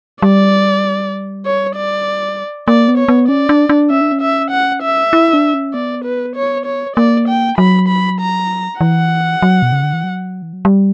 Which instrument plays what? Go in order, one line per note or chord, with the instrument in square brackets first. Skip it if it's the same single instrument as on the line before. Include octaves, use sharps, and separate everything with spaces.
[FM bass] G3 [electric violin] D5
[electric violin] C#5
D5
[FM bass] A#3 [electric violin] D5
[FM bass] B3
[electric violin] C#5
[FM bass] B3
[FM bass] C#4 [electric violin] D5
[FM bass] D4
D4
[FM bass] C#4 [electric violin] E5
[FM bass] D4
C#4
[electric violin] E5
F#5
E5
[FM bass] E4
D4
C#4
[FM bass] B3 [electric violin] D5
[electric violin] B4
C#5
C#5
[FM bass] A#3 [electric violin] D5
[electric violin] G5
[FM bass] F#3 [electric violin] B5
[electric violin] B5
A#5
[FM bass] E3 [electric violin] F#5
[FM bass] F#3
B2
C#3
D3
E3
F#3
E3
F#3
G3